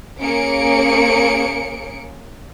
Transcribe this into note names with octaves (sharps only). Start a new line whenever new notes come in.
A#3 C#4 G#4 C#7 D7